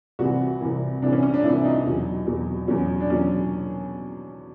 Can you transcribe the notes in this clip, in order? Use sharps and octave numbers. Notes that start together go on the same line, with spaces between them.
C2 C3 E3 F#4
C2 C3 E3
C2 C3 E3 D4
C#4
C#4
D4
C2 C3 E3 E4
D#4
E2 B2 F#3
E2 B2 F#3
E2 B2 F#3 C#4
D4
E2 B2 F#3 C#4